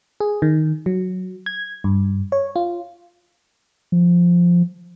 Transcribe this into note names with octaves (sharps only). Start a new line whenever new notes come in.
G#4
D#3
F#3
G#6
G2
C#5
F4
F3